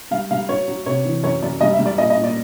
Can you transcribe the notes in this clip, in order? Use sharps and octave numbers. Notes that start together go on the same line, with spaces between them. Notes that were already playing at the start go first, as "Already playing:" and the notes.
G3 F5
G3 F5
F#3 C#5
F#3
C3 C#5
E3
F#2 C#5
F#2 D5
G3 D#5
E5
G3
D5
A#2 D#5
D#5
A#2
D5